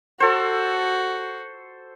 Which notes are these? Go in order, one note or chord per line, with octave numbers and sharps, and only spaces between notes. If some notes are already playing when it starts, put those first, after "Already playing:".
F#4 A4 C5